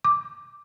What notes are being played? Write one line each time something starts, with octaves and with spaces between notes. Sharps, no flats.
D6